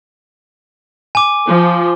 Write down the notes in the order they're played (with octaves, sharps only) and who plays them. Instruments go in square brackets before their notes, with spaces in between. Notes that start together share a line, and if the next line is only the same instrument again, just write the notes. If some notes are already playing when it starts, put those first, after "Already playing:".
[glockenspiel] G#5 D6
[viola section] F3